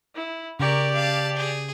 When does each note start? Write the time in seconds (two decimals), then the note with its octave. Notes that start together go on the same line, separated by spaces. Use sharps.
0.15 E4
0.60 C#3 G4 A#4 D5 C#6
0.94 F5 A5
1.36 G#4